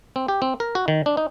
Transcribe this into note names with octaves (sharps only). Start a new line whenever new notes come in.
C4
G4
C4
A#4
F#4
D#3
D4
D#4